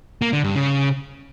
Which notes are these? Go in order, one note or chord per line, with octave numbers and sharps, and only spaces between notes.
A#3
D3
G2
C#3